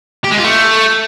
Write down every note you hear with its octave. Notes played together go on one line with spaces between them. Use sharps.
G4
G#3
F4
A3